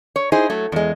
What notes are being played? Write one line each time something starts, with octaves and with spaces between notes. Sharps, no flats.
C#5
D#4 E4 G#4 C5
F#3 A3
E2 G#3